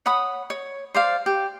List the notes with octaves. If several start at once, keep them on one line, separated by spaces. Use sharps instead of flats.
C#5 F#5 B5 D#6
C#5
C5 D5 F5
G4